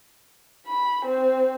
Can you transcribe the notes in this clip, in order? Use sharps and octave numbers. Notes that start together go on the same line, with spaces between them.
B5
C4